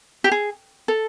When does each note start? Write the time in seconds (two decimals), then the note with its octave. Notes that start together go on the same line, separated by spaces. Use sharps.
0.24 G4
0.32 G#4
0.88 A4